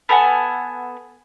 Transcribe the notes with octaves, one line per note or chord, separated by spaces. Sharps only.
B3 A4 F#5 G#5